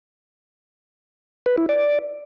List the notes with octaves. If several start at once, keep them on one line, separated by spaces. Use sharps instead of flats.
B4
E4
D5